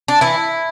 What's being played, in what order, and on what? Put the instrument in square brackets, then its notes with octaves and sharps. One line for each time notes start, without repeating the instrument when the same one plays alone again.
[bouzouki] D4
E3 E4